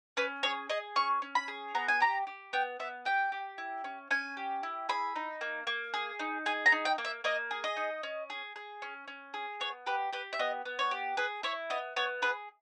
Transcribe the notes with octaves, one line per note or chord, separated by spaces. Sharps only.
C#4 B4
G#4 C#5
G#4 D#5
C#4 C#6
C#4
B5
G#4
B3 A#5
G#5
G4 A#5
G4
B3 G5
B3 E5
G4 G5
G4
E4
C#4
C#4 G#5
G4
E4
G#4 B5
D#4
A#3
A#3
G#4
D#4
G#4 G#5
A#5
D#4
G5
A#3
E5
A#3 D#5
G#4
D#5
D#4
C#4
G#4
G#4
C#4
C#4
G#4
B3 C#5
G4 B4
G4 B4
E5
B3 D#5
B3
C#5
G4
G#4 B4
E4 C#5
B3 D#5
B3 C#5
G#4 B4